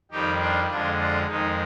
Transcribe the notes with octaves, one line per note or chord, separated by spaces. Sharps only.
F2 D#3 G3 D#4 G4
D4 F4
F2 D3 G#3 D4 F4
D4 F4
F2 D#3 G#3 D#4